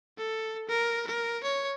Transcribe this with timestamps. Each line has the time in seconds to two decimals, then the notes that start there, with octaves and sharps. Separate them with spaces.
0.18 A4
0.69 A#4
1.07 A#4
1.43 C#5